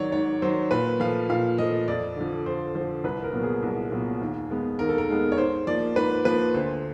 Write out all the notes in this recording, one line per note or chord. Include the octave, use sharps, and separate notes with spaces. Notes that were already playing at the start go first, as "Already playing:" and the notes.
Already playing: G#2 D#3 F#3 C#5 D5
G#2 C#5
D#3 F#3 C5
A#2 B4
F3 A3 F5
A#2 F5
F3 A3 D#5
F2 D5
D3 F3
F2 C5
D3 F3 C5
C2 B4
A#4
A#2 F#3 B3
G#4
C2
A#2 F#3 B3
D#2
D#3 G#3 B3
D#2 A#4
A4
A#4
D#3 G#3 B3
C#5
G#2 C5
F3 A#3 D5
G#2 B4
F3 A#3 B4
D2 C5